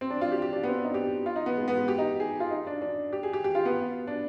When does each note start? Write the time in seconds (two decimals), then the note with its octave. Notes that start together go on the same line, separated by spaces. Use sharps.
0.01 C4
0.10 D4
0.21 F4
0.32 G4
0.42 G4
0.53 D4
0.63 B3
0.68 C4
0.74 D4
0.84 D#4
0.94 G4
1.26 F4
1.36 D#4
1.46 B3
1.57 G#3
1.68 B3
1.77 G#3
1.88 G4
1.98 D#4
2.20 G#4
2.40 F4
2.51 D#4
2.67 D4
2.82 D4
3.13 G4
3.23 G#4
3.33 G4
3.44 G4
3.55 F4
3.65 B3
4.07 D4